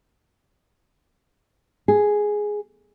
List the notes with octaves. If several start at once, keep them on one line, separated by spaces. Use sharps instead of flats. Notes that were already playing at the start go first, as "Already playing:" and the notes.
G#4